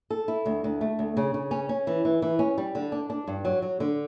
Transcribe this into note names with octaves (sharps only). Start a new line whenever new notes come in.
A4
E4
D2
D2
A3
D2
C#3
C#3
C#4
C#4
E3
E3
E3
C#4
G3
D3
D4
D4
G2
F#3
F#3
D3